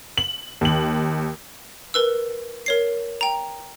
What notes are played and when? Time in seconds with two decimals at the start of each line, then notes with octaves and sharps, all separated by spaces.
0.18 F#7
0.61 D#2 F#7
1.94 A#4 B4 E6
2.66 A#4 C#5 C7
3.21 G5 A#5